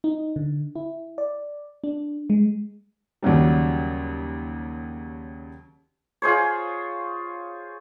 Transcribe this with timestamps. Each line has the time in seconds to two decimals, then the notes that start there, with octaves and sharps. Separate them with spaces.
0.04 D#4
0.36 D3
0.75 E4
1.18 D5
1.84 D4
2.30 G#3
3.23 D#2 C#3 F#3 G3
6.22 F4 G#4 C5 C#5